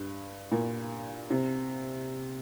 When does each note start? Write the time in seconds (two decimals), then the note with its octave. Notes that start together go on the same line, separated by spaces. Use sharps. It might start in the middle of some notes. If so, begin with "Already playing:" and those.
Already playing: G2
0.52 A#2
1.30 C3